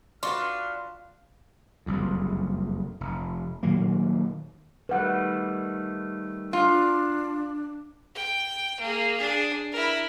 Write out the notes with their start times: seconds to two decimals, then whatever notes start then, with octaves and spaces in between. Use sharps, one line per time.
0.23 D4 F4 F#4 B4 C6 C#6 F6
1.86 F#1 C2 F2
3.01 F1
3.63 A#2 D#3 F#3 A#3
4.89 D#3 G3 A3 B4 F#5
6.53 D4 F4
8.15 G5
8.80 A#3 G#4
9.17 D4 G#4
9.72 E4 A#4